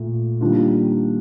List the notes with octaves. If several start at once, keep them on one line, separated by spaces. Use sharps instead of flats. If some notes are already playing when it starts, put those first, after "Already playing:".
Already playing: A#2 A3
D#3 G3 A#3 D4 F4